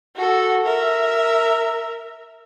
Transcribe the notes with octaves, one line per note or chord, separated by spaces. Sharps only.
F#4 A4
A#4 E5